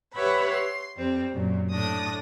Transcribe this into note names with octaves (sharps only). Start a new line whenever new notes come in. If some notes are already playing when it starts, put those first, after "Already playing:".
G4 B4 C#5 E5 F#5 B5
C6
F2 G3 C4
F#2 A#2
A2 D4 D#6 A#6